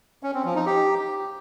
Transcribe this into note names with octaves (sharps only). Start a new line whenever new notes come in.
C#4
C4
F3
D#4
G4